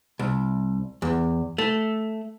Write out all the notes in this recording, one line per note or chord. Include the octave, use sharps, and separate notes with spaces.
C2
E2
A3